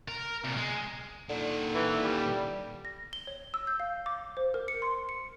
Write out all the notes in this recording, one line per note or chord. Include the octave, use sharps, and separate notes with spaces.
A#4
C2 A#2
G#3
A#2 D3 D#3
E3
G3
A#6
G7
C#5
E6
G6
F5
D6
C5
A#4
C#7
C6
C#7